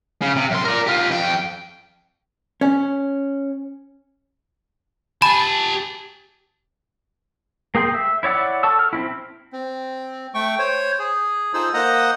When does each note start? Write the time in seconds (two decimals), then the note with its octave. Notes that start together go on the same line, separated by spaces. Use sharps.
0.22 C#3
0.36 C3
0.51 F#2 C6
0.65 A#4 D5
0.87 F4 G4
1.11 F2 G5
2.61 C#4
5.22 G4 G#5 A5 B5
7.75 A#3 G#4 G5 C6
7.94 E5
8.23 E4 C#5 D5 F#5 E6
8.63 A4 A5 C#6 E6
8.79 F6
8.93 C4 C#4 E4
9.53 C4
10.34 A3 G5 C#6
10.59 C5 C#5
10.99 G#4
11.54 D#4 F4 G#4 A4 C5 E6
11.74 A#3 C5 D#5 F#5 A#5 D#6